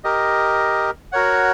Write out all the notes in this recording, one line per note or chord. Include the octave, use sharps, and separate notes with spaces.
G4 A#4 D#5
F#4 A#4 C#5 F#5